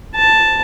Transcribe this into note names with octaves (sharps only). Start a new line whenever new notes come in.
A5